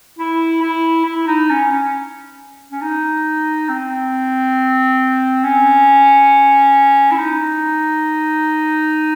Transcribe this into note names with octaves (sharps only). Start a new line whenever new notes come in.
E4
E4
E4
D#4
C#4
C#4
C#4
D#4
C4
C#4
E4
D#4